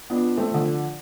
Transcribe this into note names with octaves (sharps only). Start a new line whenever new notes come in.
F2 B3 D4
A3 C4
D3 F3